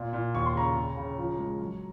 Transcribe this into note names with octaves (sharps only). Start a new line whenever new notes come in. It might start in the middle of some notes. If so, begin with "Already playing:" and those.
Already playing: A#2
A#2
D#2 C#6
C6
C#3 A#5 C#6
C#3
C#3
F3
G#3
F#3